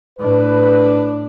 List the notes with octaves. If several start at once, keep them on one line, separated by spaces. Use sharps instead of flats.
A2 D4 B4